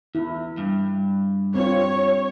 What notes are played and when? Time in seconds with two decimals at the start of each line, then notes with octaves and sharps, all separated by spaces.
0.15 E2 E4
0.57 G2
1.55 C4 F4 C#5